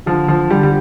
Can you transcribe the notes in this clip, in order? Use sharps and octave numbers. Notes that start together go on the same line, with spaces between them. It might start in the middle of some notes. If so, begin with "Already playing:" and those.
D3 F3
F3
D3 G3
G3